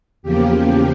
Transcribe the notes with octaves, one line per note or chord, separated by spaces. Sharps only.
E2 C#3 F3 A#3 G4